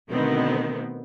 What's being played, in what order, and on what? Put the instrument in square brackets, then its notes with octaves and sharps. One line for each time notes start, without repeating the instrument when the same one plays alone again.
[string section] B2 D3 D#3 A3 B3 C4